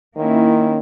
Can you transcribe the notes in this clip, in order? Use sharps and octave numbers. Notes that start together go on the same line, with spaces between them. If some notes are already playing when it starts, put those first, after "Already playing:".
D#3 A#3 C#4 E4